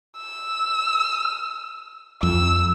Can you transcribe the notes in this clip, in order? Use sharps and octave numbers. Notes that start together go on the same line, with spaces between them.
E6
F2 E6